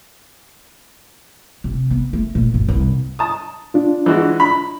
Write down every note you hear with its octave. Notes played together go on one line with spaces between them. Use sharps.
C3
B3
A3
A#2
F#2
C2
A5 D#6
D4 F4
E3 G#3 F#4
B5